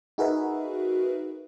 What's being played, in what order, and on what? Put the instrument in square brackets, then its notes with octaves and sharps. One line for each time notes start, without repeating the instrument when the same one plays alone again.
[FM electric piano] D#4 F#4 G#4 A#4 B4 E5